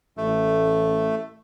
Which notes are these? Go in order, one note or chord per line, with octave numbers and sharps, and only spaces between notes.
A1 A3